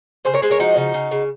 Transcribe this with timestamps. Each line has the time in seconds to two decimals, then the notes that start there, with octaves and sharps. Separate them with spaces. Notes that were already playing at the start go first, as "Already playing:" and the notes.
0.25 C#3 G#4 C5
0.34 A#4 C#5
0.42 G#3 G#4 C5
0.51 A#4 C#5
0.59 F3 D#4 F#4
0.77 C#3
0.94 C#3
1.11 C#3